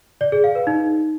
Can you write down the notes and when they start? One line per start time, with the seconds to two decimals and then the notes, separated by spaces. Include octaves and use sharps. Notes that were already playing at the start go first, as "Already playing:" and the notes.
0.21 D5
0.32 G#4
0.44 F5
0.55 B4
0.67 D#4